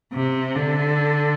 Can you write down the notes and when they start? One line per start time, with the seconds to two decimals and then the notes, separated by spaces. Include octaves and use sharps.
0.13 C3
0.56 D3